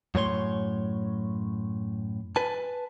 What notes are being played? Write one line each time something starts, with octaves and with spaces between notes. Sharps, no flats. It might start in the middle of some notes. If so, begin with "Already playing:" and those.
F#2 A2 C#5 C6
B4 G#5 A5